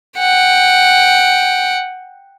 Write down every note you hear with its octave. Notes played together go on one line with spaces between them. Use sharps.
F#5 G5